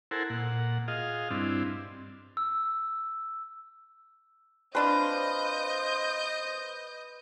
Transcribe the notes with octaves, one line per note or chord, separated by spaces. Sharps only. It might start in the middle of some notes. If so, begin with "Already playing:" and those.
E4 A4 A#4 C5 F#5 G#5
A#2 F#5
F4 G#4 D#5 F5
G2 C4 D4 E4
E6
C4 D4 F4 B4 C5 D5 D#5 G6